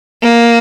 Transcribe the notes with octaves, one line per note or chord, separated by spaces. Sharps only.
A#3